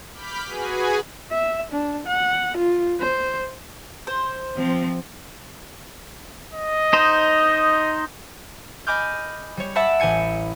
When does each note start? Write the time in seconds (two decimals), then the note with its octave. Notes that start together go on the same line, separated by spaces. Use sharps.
0.12 B5 D6 F6 G6 B6
0.46 F#4 G#4 B4 G#5
1.32 E5
1.72 D4
2.06 F#5
2.57 F4
3.00 C5
4.07 C5
4.57 F3 C4
6.54 D#5
6.93 D#4 C5
8.87 D#5 G#5 B5 D6 F6 G6
9.57 G3 C#5
9.75 D5 E5 F#5 A5 B5 F#6
10.00 A1 G4 G#5 G#6 C#7